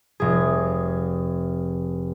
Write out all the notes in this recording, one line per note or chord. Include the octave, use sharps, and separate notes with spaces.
F1 G#4